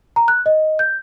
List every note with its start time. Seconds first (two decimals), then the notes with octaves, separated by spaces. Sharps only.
0.16 A#5
0.28 F#6
0.46 D#5
0.79 G6